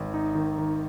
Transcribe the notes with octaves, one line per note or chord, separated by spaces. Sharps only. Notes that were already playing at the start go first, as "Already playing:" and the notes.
Already playing: G#1
D#4
D#3
D#3